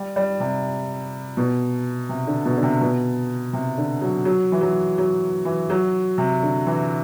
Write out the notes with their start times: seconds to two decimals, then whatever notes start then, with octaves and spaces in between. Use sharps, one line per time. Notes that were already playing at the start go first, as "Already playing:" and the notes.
Already playing: G3
0.16 G3
0.40 C3
1.37 B2
2.09 C3
2.27 D3
2.45 B2
2.57 D3
2.63 C3
2.81 B2
3.53 C3
3.78 D3
4.01 F#3
4.25 F#3
4.52 E3
4.61 F#3
4.98 F#3
5.45 E3
5.70 F#3
6.18 C3
6.43 D3
6.66 E3